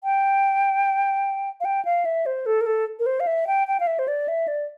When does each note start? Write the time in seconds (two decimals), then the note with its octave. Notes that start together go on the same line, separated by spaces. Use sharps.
0.04 G5
1.60 F5
1.65 G5
1.85 F5
2.05 E5
2.26 C5
2.46 A4
2.61 A#4
2.66 A4
2.99 A#4
3.06 C5
3.20 F5
3.27 E5
3.47 G5
3.68 G5
3.80 F5
3.87 E5
3.99 C5
4.08 D5
4.28 E5
4.48 D5